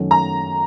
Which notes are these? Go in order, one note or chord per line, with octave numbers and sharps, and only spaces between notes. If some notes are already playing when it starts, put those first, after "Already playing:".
Already playing: F#2 D#3 F#3 A3 C#4
A#5